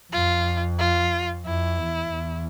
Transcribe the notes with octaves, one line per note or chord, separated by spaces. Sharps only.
F2 F4
F4
F2 E4
E2
E2